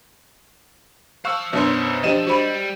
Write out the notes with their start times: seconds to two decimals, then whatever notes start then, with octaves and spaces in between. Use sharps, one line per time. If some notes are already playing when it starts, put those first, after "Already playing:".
1.25 C5 F5 A5 C#6 E6 F#6
1.53 F#2 B2 F#3 D4 C5 C#5 E5 C6
2.04 F3 D4 G4 C5 D#5 A#5 D#7 E7
2.27 G3 F#4 C5 B5